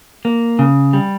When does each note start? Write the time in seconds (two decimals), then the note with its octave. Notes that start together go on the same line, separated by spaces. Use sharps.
0.25 A#3
0.59 C#3
0.93 G3